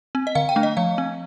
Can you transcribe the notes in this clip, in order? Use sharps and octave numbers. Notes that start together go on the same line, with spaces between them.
C4
D#5
D3 F5
G5
A3 D4
D#5
F3 F5
C4